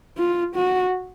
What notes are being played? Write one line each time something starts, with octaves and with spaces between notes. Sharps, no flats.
F4
F#4